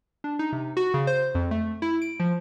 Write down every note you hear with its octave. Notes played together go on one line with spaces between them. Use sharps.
D4
D#4
C3
F#4
C#3
C5
F2
A3
E4
D7
F3